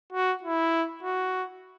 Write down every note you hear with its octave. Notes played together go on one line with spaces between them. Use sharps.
F#4
E4
F#4